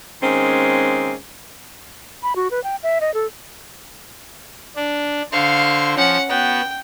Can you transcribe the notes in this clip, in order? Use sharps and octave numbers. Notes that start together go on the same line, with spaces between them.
D#3 G#3 A#3 C4 C#4
B5
F#4
B4
G5
E5
D#5
A4
D4
D3 C5 F5 C#6
F3 C#4 F#5
B3 F#4 G5